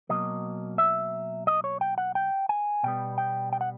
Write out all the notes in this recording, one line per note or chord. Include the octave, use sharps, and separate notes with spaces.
B2 F#3 A#3 D#5
E5
D#5
C#5
G5
F#5
G5
G#5
B2 G3 B3 G5
G5
G5
F#5